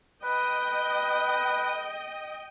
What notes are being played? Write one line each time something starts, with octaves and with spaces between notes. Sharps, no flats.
B4 D#5 G5